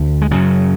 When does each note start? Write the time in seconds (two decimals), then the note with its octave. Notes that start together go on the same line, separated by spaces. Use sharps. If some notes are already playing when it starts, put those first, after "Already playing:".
Already playing: D2 D3
0.22 G#3
0.31 F#2 C#3 F#3